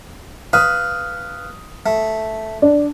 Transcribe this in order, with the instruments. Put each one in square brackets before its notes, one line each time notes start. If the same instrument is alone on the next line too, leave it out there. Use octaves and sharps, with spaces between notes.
[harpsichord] B4 F5 [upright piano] D#6
[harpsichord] A3
[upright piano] D4